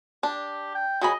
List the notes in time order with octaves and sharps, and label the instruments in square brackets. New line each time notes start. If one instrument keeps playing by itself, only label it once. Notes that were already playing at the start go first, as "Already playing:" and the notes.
[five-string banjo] D4 [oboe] G4
[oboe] G5
[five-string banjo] F#3 G#4 B5 [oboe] D#5